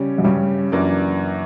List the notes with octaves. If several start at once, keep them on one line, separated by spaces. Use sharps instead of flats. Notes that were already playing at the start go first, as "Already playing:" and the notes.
Already playing: C#3 G3 C#4
F#2
G2 C#3 G3 C#4
F#2 E3 A#3 D4